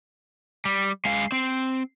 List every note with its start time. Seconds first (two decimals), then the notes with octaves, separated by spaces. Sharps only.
0.65 G3
1.05 G#3 F5
1.32 C4